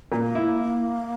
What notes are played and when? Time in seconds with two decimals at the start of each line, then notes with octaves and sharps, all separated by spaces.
0.12 A#2 C4
0.16 A#3
0.35 E4